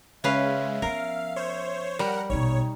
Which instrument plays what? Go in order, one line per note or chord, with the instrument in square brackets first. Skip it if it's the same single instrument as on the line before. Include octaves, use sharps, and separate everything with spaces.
[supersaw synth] C#3 G#3 [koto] C#4 B4 F5 [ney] E5
[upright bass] F3 B3 [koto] A#4 [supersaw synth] F5
[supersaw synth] C5 C#5
[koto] G3 [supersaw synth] A#4 F#5
[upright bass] A#1 B2 [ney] D#4 [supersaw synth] C#5